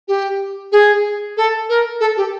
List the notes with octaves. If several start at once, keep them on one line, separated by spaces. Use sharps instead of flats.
G4
G#4
A4
A#4
A4
G4